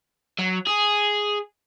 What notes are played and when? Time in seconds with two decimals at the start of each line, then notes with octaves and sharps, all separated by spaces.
0.39 F#3
0.67 G#4